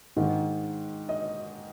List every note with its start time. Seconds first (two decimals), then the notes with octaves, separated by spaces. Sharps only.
0.16 G#2 D#3
1.09 D#5